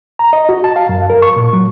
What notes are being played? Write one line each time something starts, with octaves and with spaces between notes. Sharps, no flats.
A#5
D#5
F#4
A5
F5
F#2
A#4
C#6
A#2
F#3